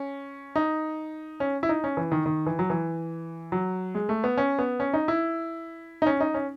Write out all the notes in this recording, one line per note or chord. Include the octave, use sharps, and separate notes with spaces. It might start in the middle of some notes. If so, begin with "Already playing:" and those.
Already playing: C#4
D#4
C#4
E4
D#4
C#4
E3
D#3
D#3
E3
F#3
E3
F#3
G#3
A3
B3
C#4
B3
C#4
D#4
E4
D#4
C#4
D#4
C#4